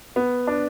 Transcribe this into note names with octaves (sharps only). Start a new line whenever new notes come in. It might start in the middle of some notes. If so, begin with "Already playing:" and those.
B3
D4